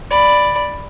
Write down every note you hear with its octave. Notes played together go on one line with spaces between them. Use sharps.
D5 B5